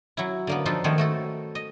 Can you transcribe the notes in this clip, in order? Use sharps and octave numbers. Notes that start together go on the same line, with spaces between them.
F#3 E4
D3 A#3 B3
F3 D4 D#4 F4 A4 B4
D#3 A3 B3 C5 C#5
A3 F#4 A4
D#5